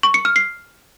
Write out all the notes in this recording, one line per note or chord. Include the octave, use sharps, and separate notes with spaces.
C#6
C#7
F6
C7